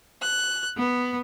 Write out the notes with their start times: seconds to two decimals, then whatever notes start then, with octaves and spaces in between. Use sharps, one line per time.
0.21 F#6
0.76 B3